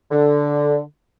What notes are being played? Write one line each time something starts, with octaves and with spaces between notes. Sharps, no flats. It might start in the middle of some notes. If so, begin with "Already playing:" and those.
D3